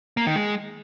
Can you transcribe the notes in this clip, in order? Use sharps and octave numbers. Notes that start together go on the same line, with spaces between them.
A#3
D#3
G#3